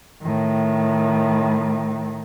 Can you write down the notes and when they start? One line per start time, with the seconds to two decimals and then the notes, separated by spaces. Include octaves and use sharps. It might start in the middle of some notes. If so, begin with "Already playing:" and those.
0.22 A2 D#3